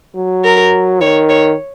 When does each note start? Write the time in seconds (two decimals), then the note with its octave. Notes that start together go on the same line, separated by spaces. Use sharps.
0.16 F#3
0.44 A#4
1.01 D#3 C#5
1.29 C#5